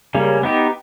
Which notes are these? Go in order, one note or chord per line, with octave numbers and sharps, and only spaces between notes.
C#3 G3 A#3 C#4
B3 D#4 G4